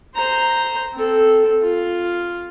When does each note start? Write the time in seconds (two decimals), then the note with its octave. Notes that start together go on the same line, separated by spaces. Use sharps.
0.15 C5 A#5
0.94 C4 A4
1.62 F4